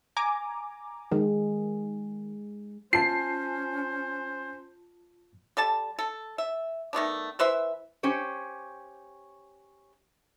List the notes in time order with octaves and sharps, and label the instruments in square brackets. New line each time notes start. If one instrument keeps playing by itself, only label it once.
[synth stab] G#5 A#5 D6
[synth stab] D#3 [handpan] G#3
[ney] C#4 [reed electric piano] F4 A5 [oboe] C5 [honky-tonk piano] C7
[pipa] G3 A4 A5
A4
E5
D#3 A3 B3 D4
E3 B4 C5 E5
[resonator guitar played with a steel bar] C#4 G4 C5 C#5